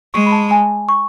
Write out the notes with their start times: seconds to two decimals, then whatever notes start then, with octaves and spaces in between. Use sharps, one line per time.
0.14 G#3 C#6
0.26 B5
0.32 A5
0.51 G#5
0.89 C#6